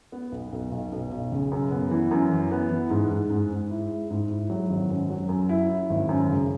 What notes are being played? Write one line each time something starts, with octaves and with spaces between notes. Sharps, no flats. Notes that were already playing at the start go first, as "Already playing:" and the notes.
B3
B1
B1
B1
B1
B1
C#3
F#2
B3
E3
F#2
E3
B3
E3
G#2
G#2
G#2
G#2
E4
G#3
G#2
E4
F#3
G#1
F#2
F#3
F#2
E4
E4
G#1
F#2
C#3